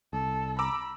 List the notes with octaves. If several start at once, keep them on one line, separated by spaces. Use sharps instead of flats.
C2 A4
A#5 B5 D6 E6